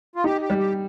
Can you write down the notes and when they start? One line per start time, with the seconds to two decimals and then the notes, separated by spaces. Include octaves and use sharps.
0.16 F4
0.24 D#4 G4
0.41 G4
0.50 G3
0.58 G4